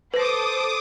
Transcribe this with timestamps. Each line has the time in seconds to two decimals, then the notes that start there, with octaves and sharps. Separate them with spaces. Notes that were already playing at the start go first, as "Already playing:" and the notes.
0.14 A4 B4 C5 D6 D#6 A#6